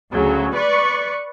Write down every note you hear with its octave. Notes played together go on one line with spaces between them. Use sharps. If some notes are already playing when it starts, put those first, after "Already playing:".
D2 C#3 F#3
B4 D5 C#6